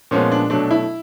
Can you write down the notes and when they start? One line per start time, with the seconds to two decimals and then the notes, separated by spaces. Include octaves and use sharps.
0.11 A#2 F3 G#3 B3 C#4
0.32 D4
0.50 B2 F#3 A3 D4
0.71 E4